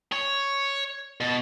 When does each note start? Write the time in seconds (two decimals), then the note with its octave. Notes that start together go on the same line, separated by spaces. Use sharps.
0.12 C#5
1.21 B2